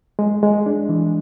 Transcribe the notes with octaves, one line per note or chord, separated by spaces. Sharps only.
G#3
G#3
D4
E3